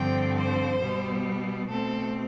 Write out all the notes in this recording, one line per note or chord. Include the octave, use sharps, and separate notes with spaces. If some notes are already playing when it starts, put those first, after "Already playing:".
Already playing: G2 D3 F3 C4 G5
C5
B2 G3 B3
B2 A3 C4 A4